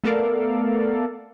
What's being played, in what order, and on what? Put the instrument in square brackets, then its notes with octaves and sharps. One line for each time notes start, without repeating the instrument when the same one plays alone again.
[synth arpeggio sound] A3 B3 A4 A#4 D5 F5